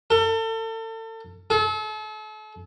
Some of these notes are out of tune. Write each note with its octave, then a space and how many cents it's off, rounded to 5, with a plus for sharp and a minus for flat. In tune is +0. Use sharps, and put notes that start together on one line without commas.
A4 +35
A4 -40